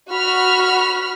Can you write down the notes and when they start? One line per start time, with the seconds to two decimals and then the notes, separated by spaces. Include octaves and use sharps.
0.10 F#4 B5 F6